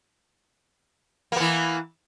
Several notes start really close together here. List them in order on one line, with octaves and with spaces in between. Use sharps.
A#3 B3 E3